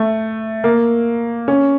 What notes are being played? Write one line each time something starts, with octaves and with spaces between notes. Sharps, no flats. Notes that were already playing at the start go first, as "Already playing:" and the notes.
Already playing: A3
A#3
C#4